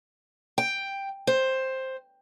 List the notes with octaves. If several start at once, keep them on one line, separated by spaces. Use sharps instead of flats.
G5
C5